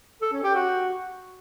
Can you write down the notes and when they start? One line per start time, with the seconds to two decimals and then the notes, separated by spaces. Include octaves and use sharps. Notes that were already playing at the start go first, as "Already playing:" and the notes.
0.21 A4
0.32 C#4
0.44 G4
0.55 F#4